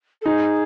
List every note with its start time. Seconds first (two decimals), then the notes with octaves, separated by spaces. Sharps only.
0.21 A4
0.25 D#4 G#4